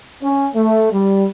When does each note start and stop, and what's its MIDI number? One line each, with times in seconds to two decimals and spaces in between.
0.23 0.48 61
0.55 0.89 57
0.93 1.26 55